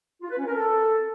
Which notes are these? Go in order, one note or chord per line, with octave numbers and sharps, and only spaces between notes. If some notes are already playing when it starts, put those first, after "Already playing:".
F4
B4
C#4
A#4
A4